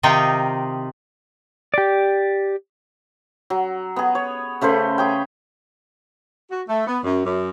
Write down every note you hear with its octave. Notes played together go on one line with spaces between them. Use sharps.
C3 D#3 D#4 F4 G5
G4 D5
F#3
B3 G#4
C#5
C#3 A3 B4 C5
G#4 C#5 G5
F#4
A3
B3
F#2
F#2